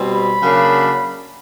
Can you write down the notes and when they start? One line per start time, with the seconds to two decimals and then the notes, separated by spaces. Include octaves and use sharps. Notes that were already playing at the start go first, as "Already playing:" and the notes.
Already playing: B2 G3 C4
0.11 B5
0.42 C#3 F#3 A#3 D4